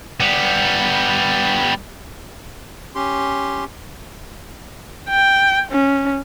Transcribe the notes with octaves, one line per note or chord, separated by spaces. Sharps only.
G3 B3
C#4 G4 C6
G5
C#4